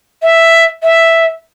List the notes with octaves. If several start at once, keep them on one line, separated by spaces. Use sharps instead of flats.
E5
E5